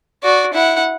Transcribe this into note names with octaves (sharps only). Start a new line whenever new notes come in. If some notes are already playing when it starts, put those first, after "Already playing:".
F#4 D5
E4 F#5